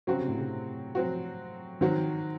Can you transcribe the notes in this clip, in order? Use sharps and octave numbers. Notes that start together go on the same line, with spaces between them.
C#3 F#3 C4 F#4
C3
A2
C3
F#3 C4 F#4
D#3 F#3 C4 F#4